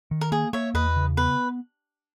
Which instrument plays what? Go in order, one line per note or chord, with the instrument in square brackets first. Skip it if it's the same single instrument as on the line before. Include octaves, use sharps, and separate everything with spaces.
[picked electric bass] D#3
[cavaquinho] A#4
[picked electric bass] A#3 [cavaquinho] G#4
[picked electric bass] A#3 [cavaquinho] C#5 E5
[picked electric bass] E2 [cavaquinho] B4 D#5
[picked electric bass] C#3
[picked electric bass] B3 [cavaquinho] B4